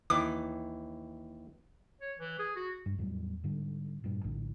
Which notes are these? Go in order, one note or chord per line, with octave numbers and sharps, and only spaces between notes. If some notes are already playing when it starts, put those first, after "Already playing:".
D#2 E3 D6
C#5
E3
G#4
F#4
G2
E2 A2 F#3 G3
G#2 D3 G3
G2 A#2
A#1 A2 D3